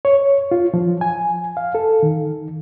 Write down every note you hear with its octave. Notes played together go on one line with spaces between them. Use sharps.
C#5
F4
F3
G#5
F5
A4
D#3